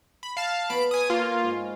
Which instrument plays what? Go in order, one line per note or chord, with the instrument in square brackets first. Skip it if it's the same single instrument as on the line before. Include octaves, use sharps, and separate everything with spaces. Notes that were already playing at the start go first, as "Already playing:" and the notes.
[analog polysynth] B5
F5 A5
[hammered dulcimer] B3 C#5 [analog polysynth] B5 D7
[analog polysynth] G#5 D#6
A#3 F4
[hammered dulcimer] G#2